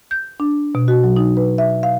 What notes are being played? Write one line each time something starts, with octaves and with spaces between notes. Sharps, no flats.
G6
D4
B2
F#4
F#3
D#4
B4
E5
F5